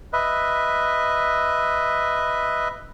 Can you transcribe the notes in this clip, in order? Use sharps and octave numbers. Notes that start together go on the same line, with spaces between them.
B4 D#5 E5